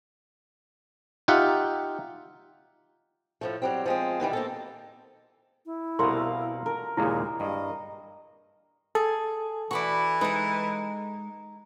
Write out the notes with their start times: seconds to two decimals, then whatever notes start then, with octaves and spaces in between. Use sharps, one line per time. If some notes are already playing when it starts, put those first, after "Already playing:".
1.28 D#4 F4 G4 E5 F#5
3.41 A2 F3 A3
3.62 F#3 G3 C4
3.86 F3 G#3 C4
4.20 B2 D#3 E3 G3
4.33 A#3 C4 A4
5.66 E4
5.99 C2 B2 A#4 F5 F#5 C6
6.66 A#4
6.97 D#2 A#2 C#3 G#3 E4
7.40 G2 D#5
8.95 G#4 A4
9.71 E3 F#4 D5 B5 C#6
10.21 G#3 D#4 B4 A#5